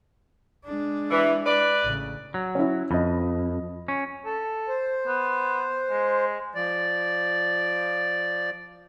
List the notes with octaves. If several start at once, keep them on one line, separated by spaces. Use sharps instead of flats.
G#3 D4
E3
B4 D5
A1 C#3
F#3
C#4 E4
F2 D#5 B5
C#4
A4
C5
B3
G#3
F3 D5